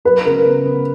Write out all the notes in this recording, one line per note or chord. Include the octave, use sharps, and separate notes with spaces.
F#3 B4
C#3 A#4
B3
B3